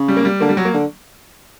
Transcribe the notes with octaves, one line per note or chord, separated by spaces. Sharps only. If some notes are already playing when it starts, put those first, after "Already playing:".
Already playing: C#3
G3
A#3
G3
D3 A#3
G3
F#3
A#3
D3